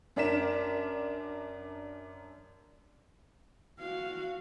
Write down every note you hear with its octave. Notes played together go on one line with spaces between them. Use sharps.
F#2 D4 A#4 B6 E7
F#4 F5